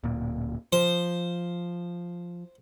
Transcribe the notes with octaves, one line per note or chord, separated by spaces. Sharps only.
D1 A#2
F3 C5